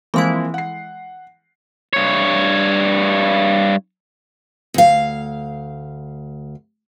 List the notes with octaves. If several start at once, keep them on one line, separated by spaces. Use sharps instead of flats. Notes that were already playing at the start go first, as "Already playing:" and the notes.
E3 F3 G#3 A#3 C4 E4
F#5 C7
G2 C#5
D2 F5